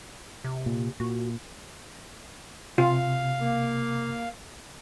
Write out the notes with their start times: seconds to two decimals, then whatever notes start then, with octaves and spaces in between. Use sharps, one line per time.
0.44 C3
0.66 A#2
1.00 A#2 F#4
2.78 C3 F4 F5
3.41 A#3